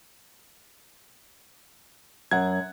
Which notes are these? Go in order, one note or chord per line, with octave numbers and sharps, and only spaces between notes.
F#2 F#5 G#6